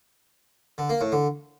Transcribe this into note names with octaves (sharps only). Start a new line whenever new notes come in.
D3
A#3
A2
D3